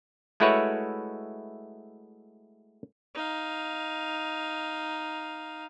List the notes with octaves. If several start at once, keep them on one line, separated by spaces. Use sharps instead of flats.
G#3 A3 E4 F#4 B4 C#5
D#4 F5